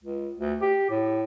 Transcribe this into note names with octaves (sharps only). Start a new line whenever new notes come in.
C#2
D2
G4
A2